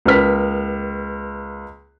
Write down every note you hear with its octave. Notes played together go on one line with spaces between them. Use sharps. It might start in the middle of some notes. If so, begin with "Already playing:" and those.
C#2 A#3 B4 F6 B6